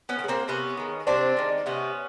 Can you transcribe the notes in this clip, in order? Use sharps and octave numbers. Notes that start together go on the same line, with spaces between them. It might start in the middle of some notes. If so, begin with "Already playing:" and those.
B3 C#4
D#3
G#3
A#3 C4
C3 B3 C#4
D#3 G#3
C3 C4 D4
D#3 G#3
C3 B3 C#4